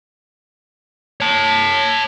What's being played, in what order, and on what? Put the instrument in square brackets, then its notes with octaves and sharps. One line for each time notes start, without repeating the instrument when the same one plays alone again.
[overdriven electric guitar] C#5 A5